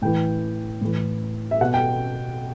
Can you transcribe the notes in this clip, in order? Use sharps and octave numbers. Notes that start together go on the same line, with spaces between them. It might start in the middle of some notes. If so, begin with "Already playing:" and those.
A2 E3 G5
A2 E3
E5
B2 F#5
G5